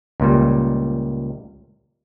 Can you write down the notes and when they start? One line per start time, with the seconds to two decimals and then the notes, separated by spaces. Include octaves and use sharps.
0.20 C#2 A#2 G3